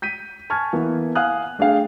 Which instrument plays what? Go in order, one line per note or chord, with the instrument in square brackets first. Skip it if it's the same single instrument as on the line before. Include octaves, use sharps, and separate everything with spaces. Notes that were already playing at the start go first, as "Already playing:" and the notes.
[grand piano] G6 B6 D#7
G#5 A5 C#6 F6 G#6
E3 A#3 B3
F5 F#5 G#5 D#6 F6 F#6
A3 D4 G#4 F5 G5